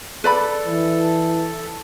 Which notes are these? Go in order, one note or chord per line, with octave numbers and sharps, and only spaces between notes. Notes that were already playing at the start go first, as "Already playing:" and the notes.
A4 B4 D5 B5
E3